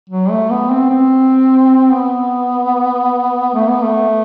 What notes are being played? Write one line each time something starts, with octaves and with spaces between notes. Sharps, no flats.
F#3
A3
B3
C4
C4
B3
A3
B3
A3